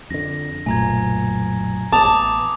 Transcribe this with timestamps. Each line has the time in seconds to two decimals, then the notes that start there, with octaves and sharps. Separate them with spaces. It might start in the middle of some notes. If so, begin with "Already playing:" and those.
0.10 F2 D3 A#6
0.66 F#1 B1 A#2 A3 G#5 A#5 G#6
1.92 A1 B3 A5 D6 D#6 F7